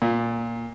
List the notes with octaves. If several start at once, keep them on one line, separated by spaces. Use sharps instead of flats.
A#2